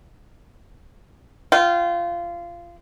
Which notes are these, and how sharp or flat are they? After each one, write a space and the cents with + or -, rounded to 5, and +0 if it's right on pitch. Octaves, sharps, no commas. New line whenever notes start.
F4 -20 G5 -35